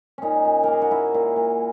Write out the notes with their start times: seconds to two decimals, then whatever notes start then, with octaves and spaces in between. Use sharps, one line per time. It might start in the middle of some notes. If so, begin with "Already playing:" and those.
0.18 A#2 C#4 D#4
0.45 A#2
0.64 A#3 A#4
0.73 G#4
0.82 F#4
0.91 A#3 E4
1.14 A#2
1.36 A#2